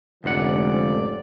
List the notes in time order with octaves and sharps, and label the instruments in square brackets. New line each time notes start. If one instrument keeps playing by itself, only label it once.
[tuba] F1 [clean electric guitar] D2 G#2 F#5 [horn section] F3 C#4 D5